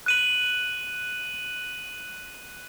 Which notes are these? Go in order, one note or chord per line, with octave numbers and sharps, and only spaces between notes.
F#6 D#7 F#7